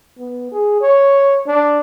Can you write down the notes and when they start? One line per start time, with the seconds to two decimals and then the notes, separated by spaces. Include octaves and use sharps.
0.19 B3
0.52 G#4
0.81 C#5
1.47 D4